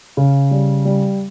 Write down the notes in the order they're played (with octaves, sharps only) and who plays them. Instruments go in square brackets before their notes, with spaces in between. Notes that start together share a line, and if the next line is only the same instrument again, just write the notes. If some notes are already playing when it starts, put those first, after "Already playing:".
[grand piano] C#3
G3
G3